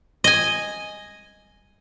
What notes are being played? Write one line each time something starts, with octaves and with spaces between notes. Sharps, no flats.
D#5 G#5